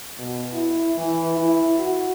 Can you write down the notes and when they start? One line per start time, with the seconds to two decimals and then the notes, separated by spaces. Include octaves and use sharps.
0.18 B2
0.53 E4
0.97 E3
1.37 E4
1.78 F#4